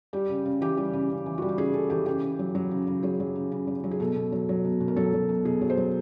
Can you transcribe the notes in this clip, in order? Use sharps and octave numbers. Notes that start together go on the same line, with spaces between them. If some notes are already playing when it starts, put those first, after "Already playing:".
G3 G4
C#3
C#3
E3 G4
G3
C#3
C#3
E3
G3 F#4
G4
C#3 G#4
C#3 A4
E3 G4
C#3 G4
C#3
F#3
F#3
C#3
C#3
F#3 G#4
F#3
C#3
C#3
F#3
F#3
G#4
B2 A4
B2
F#3
F#3
B2
B2
A#4
F#3 A4
F#3
B2
B2 G#4
F#3
C5
F#3